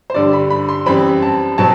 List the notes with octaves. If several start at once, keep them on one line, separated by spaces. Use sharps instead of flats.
C5
G2 D3 G3 D5
B5
B5
C6
F#2 E3 G3 C4 B5
A5
B2 F#3 C4 A5